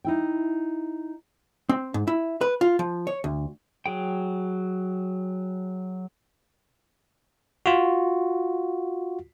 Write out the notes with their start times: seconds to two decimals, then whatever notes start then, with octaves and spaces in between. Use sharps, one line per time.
0.04 D#4 E4 G5
1.69 C4
1.94 G#2
2.08 E4
2.41 B4
2.61 F4
2.79 F3
3.07 C#5
3.24 D2
3.86 F#3 G#4 G5
7.66 F4 F#4